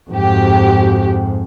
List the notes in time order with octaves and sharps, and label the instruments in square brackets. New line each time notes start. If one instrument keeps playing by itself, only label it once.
[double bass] F2 G#2 [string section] F#4 G4